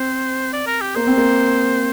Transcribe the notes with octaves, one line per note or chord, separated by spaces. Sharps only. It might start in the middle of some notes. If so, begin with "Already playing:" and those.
Already playing: C4 C5
D5
A#4
G4
A#3 C5
C4
A#3